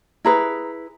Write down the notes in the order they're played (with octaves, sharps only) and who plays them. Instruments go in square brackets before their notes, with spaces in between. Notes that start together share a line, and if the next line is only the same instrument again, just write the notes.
[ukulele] E4 G#4 B4 A#5